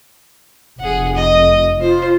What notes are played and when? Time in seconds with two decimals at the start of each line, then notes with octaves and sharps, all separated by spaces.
0.79 F1 G#4 F#5
1.15 D#5
1.81 F4 C5